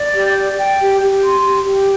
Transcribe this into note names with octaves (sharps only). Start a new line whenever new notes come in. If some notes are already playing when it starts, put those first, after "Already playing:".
Already playing: D5
G4
D5
G5
G4
G4
C6
G4
G4